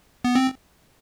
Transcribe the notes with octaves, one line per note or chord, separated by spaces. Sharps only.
B3
C4